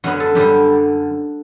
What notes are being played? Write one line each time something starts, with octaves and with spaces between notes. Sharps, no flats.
F#2 D3 F#3 B3 F#4
A4
F#2 D3 G3 G4